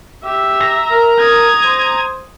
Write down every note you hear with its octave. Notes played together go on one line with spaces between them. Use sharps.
G4 E5
A#5
A#4
D#6 G#6
C5